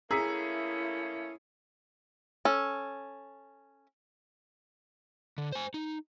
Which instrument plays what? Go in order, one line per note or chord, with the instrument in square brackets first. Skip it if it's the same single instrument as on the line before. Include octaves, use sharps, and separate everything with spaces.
[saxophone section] A3 A#3 C#4 [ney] E4 [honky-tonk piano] G#4 [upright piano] A#5 E6 B6
[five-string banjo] C#4 A4
[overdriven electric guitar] D3
C5 G#5
D#4